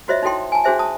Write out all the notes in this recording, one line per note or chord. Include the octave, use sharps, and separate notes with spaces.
F4 F#4 C5 C#5 D#5 E5
D#4 E4 F#4 A4 G5 C6
G#5 A5
D4 F#4 G#4 C5 E5 G#5
A5 D#6